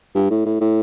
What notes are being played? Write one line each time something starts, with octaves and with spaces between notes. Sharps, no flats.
G2
A2
A2
A2